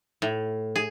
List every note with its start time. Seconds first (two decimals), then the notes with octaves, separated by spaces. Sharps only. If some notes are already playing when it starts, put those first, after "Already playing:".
0.22 A2
0.76 G#4